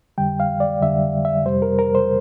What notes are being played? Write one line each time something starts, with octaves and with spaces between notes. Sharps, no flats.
F2 D3 G3 G5
F5
D5
F2 D3 G3 E5
E5
F2 C3 G3 C5
A#4
A#4
C5